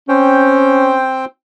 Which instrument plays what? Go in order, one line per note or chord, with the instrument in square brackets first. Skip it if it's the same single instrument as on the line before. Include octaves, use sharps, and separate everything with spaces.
[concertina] C4 C5 G5 [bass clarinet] C#4